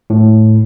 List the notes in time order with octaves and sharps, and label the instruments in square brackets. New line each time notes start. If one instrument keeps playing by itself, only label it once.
[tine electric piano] A2